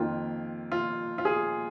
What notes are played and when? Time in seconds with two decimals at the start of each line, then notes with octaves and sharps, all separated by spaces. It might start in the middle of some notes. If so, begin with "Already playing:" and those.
Already playing: F2 D#3 A#3 F4
0.72 F4
1.18 F4
1.25 G#4